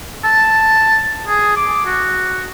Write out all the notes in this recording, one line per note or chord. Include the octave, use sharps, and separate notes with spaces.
A5
G#4
D6
F#4